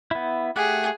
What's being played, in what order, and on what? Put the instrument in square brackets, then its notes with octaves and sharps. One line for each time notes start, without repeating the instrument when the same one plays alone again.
[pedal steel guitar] B3 E4
[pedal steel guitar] A3 G4 F#5 [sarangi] G#4